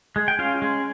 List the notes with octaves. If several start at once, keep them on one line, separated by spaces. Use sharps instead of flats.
G#3
G5
C#4 F4 F5
G#3